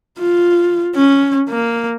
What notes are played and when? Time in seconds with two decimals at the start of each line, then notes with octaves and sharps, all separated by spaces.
0.19 F4
0.95 C#4
1.49 A#3